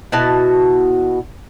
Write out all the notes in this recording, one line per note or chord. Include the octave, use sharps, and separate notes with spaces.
B2 E4 F#4 A5